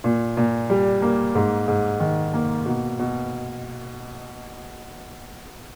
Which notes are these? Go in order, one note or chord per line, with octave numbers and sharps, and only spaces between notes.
A#2
A#2
G3
A#3
G#2
G#2
D#3
A#3
B2
B2